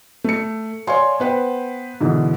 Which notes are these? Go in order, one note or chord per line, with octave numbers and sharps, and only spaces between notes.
A3 C#7
C#5 D5 F5 G#5 C6
B3 B4 C5 G5
G#2 B2 D3 E3